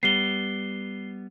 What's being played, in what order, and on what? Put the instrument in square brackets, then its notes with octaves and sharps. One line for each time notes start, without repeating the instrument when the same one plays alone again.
[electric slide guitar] G3 B3 [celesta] C7 G7